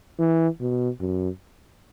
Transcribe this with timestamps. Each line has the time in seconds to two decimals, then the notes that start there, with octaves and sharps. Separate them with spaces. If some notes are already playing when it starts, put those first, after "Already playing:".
0.19 E3
0.61 B2
1.01 F#2